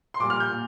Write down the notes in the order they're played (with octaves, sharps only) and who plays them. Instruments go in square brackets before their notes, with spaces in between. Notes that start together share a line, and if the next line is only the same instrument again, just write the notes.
[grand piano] C6
A#1 A#2 G3 D6
F6
G6
A#2